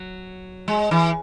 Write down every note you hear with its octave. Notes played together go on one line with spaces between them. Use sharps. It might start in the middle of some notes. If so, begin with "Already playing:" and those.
Already playing: F#3
G#3
E3